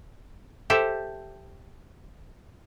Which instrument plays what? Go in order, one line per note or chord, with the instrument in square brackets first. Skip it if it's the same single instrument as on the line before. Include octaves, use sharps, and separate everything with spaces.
[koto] G4 A4 C5 E5